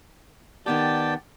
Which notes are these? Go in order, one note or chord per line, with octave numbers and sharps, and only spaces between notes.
D#3 B3 G4 D5 G5 A5